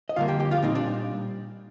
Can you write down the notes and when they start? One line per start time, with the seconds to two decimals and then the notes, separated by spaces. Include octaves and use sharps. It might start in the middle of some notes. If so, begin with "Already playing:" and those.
0.09 D#5
0.16 F2 D3 G3 A#3 F4 F5
0.28 G4 G5
0.40 G4 G5
0.51 F4 F5
0.62 A#2 G3 C4 D#4 D#5
0.75 D4 D5